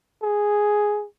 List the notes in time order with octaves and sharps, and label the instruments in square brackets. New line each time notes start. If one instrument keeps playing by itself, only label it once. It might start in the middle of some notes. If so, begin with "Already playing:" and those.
[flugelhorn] G#4